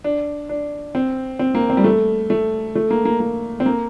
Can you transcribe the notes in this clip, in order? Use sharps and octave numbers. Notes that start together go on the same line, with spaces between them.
D4
D4
C4
C4
A#3
C4
G3
A3
A3
A3
A#3
A#3
A#3
C4
A#3